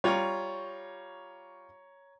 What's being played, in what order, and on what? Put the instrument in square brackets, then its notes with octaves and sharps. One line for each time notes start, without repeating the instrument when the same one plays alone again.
[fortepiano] G3 F4 [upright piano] C#5 A#5 C#6